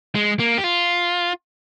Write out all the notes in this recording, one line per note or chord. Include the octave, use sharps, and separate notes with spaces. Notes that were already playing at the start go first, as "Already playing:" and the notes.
G#3
A#3
G4
F4